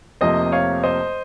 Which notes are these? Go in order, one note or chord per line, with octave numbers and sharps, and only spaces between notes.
F1 F2 C3 F3 A#3 C5 D#5
C#5 F5
C5 D#5